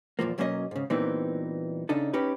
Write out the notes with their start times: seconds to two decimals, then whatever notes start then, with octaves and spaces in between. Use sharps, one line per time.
0.19 E2 A#2 F3 A#3
0.38 B1 F#3 A#3 C#4 C5 D#5
0.71 G#2 C#3
0.90 A#2 E3 G3 B3 C4 D#4
1.89 C#3 D4 D#4 A4
2.13 C#4 D#4 G4 B4